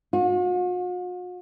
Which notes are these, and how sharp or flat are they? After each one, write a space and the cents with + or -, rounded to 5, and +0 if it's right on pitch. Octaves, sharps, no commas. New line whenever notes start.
F#4 -45